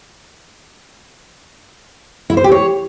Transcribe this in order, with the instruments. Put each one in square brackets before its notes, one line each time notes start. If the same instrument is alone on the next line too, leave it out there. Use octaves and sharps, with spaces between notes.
[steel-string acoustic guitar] E4
C5
G4
C#5